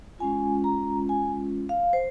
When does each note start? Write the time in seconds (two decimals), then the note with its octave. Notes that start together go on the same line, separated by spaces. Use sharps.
0.19 G#3 C#4 F4 G#5
0.64 A#5
1.09 G#5
1.69 F5
1.93 C5